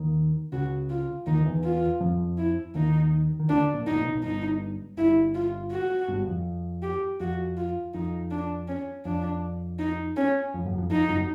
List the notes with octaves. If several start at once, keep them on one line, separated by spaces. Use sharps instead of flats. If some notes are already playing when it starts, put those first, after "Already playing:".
Already playing: D#2 D#3
C#2 C#3 F#4
F4
D#2 D#3 D#4
D#3
E2 E3
F4
F2 F3
E4
D#2 D#3 D#4
D#3
D2 D3 D4
A#1 A#2
F#1 F#2 D#4
A#1 A#2
B1 B2
G1 G2 D#4
G1 G2 E4
F4
F#4
G1 G2
F2
G4
F2 F#4
F4
F2 D#4
D4
C#4
F2 D4
D#4
C#4
F2
F#1 F#2
F2
F2 D#4
F#1 F#2